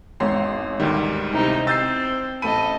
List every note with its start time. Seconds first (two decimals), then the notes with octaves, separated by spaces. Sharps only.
0.20 G#1 E2 C#5 C6
0.80 D2 G#2 D#3 G3
1.33 C3 D#4 E4 C5
1.67 C4 E6 G6 A6 C7
2.42 A1 A4 D#5 B5 D#7